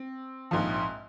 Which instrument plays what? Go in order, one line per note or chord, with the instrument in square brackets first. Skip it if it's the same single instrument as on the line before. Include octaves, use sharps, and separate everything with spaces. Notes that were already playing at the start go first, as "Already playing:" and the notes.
Already playing: [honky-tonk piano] C4
A#1 G#2 F3